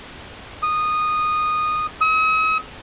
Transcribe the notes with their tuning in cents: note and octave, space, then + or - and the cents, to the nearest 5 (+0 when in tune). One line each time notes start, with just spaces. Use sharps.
D#6 -15
D#6 +45